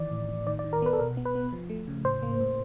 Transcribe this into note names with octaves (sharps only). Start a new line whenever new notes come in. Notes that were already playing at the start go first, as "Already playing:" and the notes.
Already playing: D#3 E3 D5
A2
A2
D#3 D5
D5
D#3
A#4
B3 B4
A4
B2 A#4
B3
B4
B3
F3
A3
C#3
A2 C5
A#3
A2